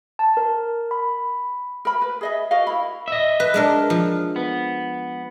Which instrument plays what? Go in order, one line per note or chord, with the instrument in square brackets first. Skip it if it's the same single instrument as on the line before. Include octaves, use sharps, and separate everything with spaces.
[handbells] A5
A#4
B5
[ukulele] A#4 B5
B4
G#4 D#5 E5
F#4 A#4 D#5 F5
E4 B5
[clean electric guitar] D#5 E5
[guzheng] B4
G#3 D4 A#4
F3
[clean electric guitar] B3